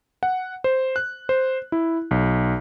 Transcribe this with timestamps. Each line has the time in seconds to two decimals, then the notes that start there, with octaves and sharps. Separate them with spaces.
0.23 F#5
0.64 C5
0.96 F#6
1.29 C5
1.72 E4
2.11 B1